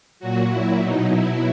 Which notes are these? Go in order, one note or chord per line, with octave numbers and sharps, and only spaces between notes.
A#2 F#3 F#4
A#2 F#3 E4
B2 F#3 D#4
B2 F#3 E4